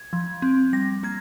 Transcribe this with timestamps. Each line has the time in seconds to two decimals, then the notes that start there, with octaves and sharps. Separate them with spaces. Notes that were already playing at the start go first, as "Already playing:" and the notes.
Already playing: G#6
0.13 F3
0.42 C4
0.73 G3 A#6
1.03 A#3 G#6